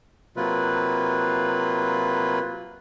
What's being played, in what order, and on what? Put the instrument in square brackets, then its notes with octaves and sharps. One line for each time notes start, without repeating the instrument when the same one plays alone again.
[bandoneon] C3 F#3 A#3 F4 B4